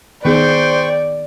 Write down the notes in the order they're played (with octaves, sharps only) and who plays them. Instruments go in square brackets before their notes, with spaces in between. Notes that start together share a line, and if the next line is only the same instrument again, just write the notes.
[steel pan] D#3 B3 G#4 [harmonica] C5 [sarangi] D5 [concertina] G5 C#6